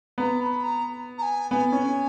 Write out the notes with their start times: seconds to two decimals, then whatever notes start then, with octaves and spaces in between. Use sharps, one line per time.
0.18 B3 A#5
0.40 B5
0.63 A#5
1.18 A#5
1.22 G#5
1.51 B3 G#5
1.72 C#4